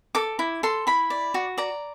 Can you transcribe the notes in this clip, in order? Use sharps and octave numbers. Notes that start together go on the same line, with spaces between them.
A4 D6
E4
A4 C6
E4 B5
D5
F#4
D5 A#5